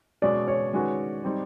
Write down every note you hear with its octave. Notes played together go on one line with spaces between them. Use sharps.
B2 G#3 C#4 D5
C#5
D#3 G#3 C#4 F#4 B4
G3 C4 D#4